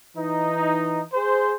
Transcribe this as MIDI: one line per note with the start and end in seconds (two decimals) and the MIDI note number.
0.17 1.03 52
0.17 1.03 63
1.13 1.52 68
1.13 1.52 72